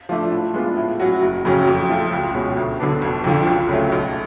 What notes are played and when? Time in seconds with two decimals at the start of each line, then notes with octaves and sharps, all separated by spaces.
0.09 F3 A3 D4
0.32 A2
0.54 G#3 B3 D4 F4
0.77 A2
0.99 F#3 C#4 F#4
1.22 F#1
1.45 F2 C#3 F#3 C#4
1.67 F2
1.89 F3 A3 F4
2.12 C#2
2.34 B2 G#3 C#4 F#4
2.57 D2
2.80 D3 F#3 B3 D4
3.02 F1
3.24 F2 D3 F3
3.47 C#2
3.69 C#3 F#3 A3
3.92 B1